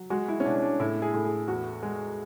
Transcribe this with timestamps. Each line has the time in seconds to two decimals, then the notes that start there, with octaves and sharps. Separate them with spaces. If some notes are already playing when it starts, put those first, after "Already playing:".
Already playing: F#3
0.10 G#3 F#4
0.28 E4
0.40 C#4
0.45 B2 D4
0.56 C#4
0.62 D4
0.80 A2 E4
1.02 G#4
1.14 A2
1.25 G#4
1.48 E2 F#4
1.83 G#3